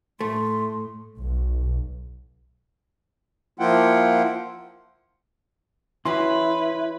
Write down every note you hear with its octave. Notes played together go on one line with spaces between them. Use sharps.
A2 A3 C6
B1
F3 A#3 E4 F4 F#5 G5
E3 C#4 E4 F#4 B4 C6